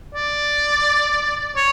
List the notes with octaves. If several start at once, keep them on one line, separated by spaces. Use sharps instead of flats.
D5
C#5